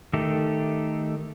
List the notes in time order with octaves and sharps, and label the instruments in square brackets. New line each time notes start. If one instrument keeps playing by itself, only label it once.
[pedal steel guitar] D#3 A3 G4 A4